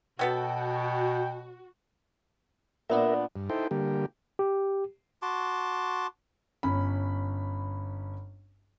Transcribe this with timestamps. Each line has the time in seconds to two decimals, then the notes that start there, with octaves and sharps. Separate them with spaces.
0.19 B2 F#3 B3 F#4 A4 G5
2.89 A#2 B3 D4 A#4 E5
3.36 G2
3.49 D#4 E4 A4 C5 G5
3.71 D3 G3 A#3 G4
4.39 G4
5.22 F#4 A5 C6 D6
6.63 G1 C#4 B5